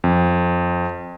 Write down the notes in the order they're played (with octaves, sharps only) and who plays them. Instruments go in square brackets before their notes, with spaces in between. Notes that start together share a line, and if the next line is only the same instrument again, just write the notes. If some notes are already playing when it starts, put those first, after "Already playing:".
[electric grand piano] F2